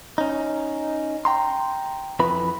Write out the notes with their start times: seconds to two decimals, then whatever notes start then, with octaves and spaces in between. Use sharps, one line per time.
0.18 C#4 D#4
1.25 G5 A#5 C6
2.19 F2 E3 B4 B5